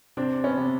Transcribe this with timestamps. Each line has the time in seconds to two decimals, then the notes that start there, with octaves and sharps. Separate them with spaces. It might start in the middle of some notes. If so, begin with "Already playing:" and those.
0.17 C3 C4 D4
0.44 B3 C#4
0.57 C3